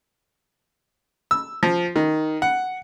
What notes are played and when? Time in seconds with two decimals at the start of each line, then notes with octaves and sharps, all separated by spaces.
1.31 E6
1.63 F3
1.96 D#3
2.42 F#5